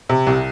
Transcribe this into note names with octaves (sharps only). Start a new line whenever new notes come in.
C3
C2